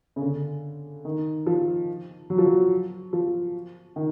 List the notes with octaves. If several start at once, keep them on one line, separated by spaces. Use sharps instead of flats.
C#3
D3
D#3
F3
F#3
F3
F#3
F3
D#3